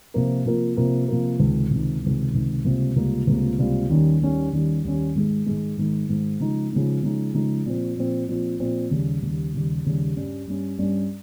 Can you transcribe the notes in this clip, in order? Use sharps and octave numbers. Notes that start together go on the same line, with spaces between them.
C3 F3 A#3 F4 A#4
C3 F3 A#3 F4 A#4
C3 F3 A#3 F4 A#4
C3 F3 A#3 F4 A#4
C#2 C3 D#3
C#2 C3 D#3
C#2 C3 D#3
C#2 C3 D#3
C#2 C3 G3 A#3 F4
C#2 C3 G3 A#3 F4
C#2 C3 G3 A#3 F4
C#2 C3 G3 A#3 F4
D#2 D#3 G3 C#4
D#2 D#3 G3 C#4
D#2 D#3 G3 C#4
D#2 D#3 G3 C#4
G#2 D#3 G#3
G#2 D#3 G#3
G#2 D#3 G#3
G#2 D#3 G#3
C#3 F3 G#3 D#4
C#3 F3 G#3 D#4
C#3 F3 G#3 D#4
C#3 F3 G#3 D#4
A#2 F3 C4
A#2 F3 C4
A#2 F3 C4
A#2 F3 C4
D#2 C#3 G3
D#2 C#3 G3
D#2 C#3 G3
D#2 C#3 G3
G2 G3 C#4
G2 G3 C#4
G2 G3 C#4